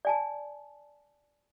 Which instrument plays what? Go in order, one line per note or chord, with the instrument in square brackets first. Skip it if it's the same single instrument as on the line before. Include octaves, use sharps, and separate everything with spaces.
[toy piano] D5 G#5 A5